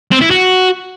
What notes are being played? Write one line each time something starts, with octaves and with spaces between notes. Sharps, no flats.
C4
E4
F#4